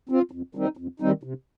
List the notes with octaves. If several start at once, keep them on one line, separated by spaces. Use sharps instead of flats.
C4 F4
F2
D#3 G3 C4 D#4
F2
D#3 G3 C4 D#4
C3